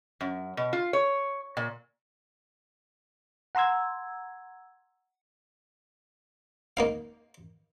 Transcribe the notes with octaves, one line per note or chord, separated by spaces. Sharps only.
F#2
B2
F4
C#5
A#2
F#5 A#5 C6 E6 G#6
A#3 D#4 F5